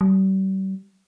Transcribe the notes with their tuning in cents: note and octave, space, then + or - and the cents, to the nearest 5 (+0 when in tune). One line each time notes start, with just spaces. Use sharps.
G3 -40